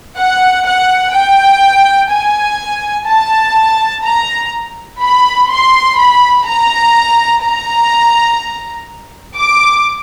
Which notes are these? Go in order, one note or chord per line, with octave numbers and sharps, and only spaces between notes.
F#5
F#5
G5
G#5
A5
A#5
B5
C6
B5
A#5
A#5
D6